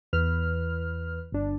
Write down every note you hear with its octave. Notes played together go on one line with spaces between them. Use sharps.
E2 B4 F6
G1 D4